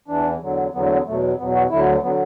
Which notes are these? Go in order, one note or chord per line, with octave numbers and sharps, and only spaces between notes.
E2 E3 D4
E2 D3 F#3
E2 D3 F#3 B3
A3
B3
E2 B2 F#3 A3
E2 B2 F#3 B3
F#4
D2 D3 F#3 E4
D3 F#3 B3